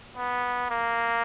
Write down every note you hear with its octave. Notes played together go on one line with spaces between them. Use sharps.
B3
A#3